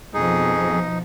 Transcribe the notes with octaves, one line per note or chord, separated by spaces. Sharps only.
F2 B2 F3 D#4 G#4